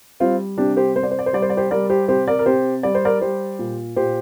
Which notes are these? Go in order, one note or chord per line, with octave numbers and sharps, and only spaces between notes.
G3 C4 F4
C3 D4 G4
G4 C5
C3 C5
D5
C5
D5
C5
G3 D5
C5
D5
G4 C5
G3 A#4 D5
G4 C5
C3 G4 C5
A#4 D5
A#4
C3 G4 C5
G3 D5
C5
A#4 D5
G3 G4 C5
A#2
A#2 G4 C5